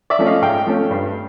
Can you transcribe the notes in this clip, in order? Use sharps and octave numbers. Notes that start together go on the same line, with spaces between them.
D5 E5
F3 A3 C#4
D#5 F5
G#2 F5 G5
F3 A3 C#4
G2